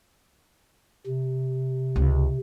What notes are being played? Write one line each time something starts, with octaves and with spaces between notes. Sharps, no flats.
C3
C#2